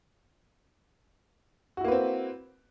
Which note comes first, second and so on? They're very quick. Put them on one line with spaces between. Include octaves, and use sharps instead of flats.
F#4 E4 A#3 B4 C4